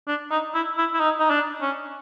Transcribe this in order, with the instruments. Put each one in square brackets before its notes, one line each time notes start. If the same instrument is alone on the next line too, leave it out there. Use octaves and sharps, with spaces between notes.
[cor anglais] D4
D#4
E4
E4
E4
D#4
D#4
D4
C#4